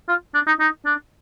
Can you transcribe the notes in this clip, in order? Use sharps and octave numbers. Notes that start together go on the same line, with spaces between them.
F4
D4
D#4
D#4
D4